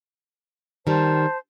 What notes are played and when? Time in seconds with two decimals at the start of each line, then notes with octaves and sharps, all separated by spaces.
0.87 D#3 G3 C5 A5